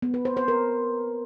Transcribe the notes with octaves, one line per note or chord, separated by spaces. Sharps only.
B3
B4
C5
C5
A#4